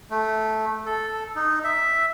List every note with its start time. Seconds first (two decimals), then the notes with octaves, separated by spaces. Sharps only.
0.10 A3
0.86 A4
1.35 D#4
1.64 E5